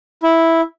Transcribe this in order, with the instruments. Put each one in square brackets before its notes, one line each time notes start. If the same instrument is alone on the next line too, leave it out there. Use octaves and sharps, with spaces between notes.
[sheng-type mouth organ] E4